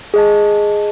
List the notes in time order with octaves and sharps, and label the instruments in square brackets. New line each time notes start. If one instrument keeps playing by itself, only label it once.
[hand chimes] G#4 D#5 A5